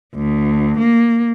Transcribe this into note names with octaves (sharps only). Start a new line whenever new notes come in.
D2
A#3